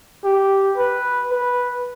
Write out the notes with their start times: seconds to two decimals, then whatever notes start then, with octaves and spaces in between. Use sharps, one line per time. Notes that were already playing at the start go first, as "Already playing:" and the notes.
0.25 G4
0.78 B4
1.31 B4